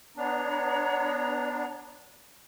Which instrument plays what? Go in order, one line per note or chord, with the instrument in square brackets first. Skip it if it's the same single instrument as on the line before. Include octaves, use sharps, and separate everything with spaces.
[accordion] B3 D4 [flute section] C#5 A#5